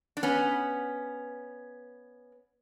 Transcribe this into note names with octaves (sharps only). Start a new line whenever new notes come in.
D4
B3 C#4